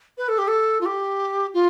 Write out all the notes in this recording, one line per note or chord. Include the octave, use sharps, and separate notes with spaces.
B4
A4
G4
A4
F4
G4
F4